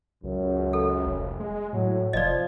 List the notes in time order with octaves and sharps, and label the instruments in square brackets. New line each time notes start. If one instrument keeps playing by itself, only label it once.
[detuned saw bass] C#2 [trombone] F#2
[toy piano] A4
[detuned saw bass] F1
G#3
[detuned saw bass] A2 [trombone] F#3
[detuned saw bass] F1 [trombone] F3 [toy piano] D5 D#5